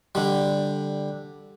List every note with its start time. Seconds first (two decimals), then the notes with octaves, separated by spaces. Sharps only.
0.15 D3 G3